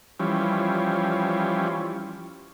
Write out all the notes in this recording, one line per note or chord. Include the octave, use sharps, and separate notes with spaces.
E3 F3 G3 C#4